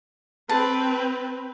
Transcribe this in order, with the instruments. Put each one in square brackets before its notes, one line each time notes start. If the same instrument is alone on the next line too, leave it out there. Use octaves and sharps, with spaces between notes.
[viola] C4 B4 [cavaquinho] A5